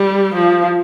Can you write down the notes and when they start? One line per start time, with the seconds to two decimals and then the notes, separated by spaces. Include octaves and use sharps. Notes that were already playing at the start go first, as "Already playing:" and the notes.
Already playing: G3
0.34 F3